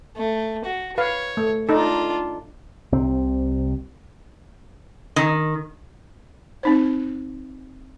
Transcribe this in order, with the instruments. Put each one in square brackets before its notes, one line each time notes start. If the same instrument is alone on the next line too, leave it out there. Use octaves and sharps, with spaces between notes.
[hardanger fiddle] A3
F#4
[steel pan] B4 F5 [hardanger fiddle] C#5
[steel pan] A3
[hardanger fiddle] D4 F4 [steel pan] D#4 A4
[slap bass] C2 C3 C4
[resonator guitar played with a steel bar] D#3
[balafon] C4 D#4 C5